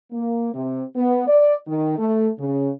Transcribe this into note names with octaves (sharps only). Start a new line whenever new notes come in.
A#3
C3
B3
D5
D#3
A3
C#3